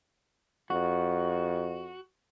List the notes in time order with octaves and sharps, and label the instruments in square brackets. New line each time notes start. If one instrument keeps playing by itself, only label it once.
[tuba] F2 [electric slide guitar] F#4